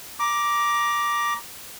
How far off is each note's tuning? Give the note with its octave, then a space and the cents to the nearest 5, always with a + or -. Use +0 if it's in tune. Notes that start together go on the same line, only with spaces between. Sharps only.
A#5 +20 D6 +0